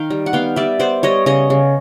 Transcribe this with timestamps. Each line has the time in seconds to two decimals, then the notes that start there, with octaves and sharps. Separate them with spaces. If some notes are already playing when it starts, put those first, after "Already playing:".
Already playing: D#3 F5 G5
0.10 G3
0.26 F#5
0.33 B3 F5 G5
0.56 G3 D5 E5
0.79 B3 C5 D5
1.03 G3 C#5 D#5
1.26 C#3 C#5 D#5
1.50 C#3